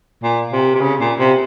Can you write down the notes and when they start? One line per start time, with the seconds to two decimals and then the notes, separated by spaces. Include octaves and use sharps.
0.23 A#2
0.52 C3
0.75 C3
0.81 C#3
1.01 A#2
1.19 C3